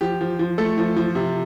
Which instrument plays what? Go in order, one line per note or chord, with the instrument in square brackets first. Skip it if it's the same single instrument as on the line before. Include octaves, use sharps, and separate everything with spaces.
[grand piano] F3 G4
F3
F3
A3 A4
F3
F3
C3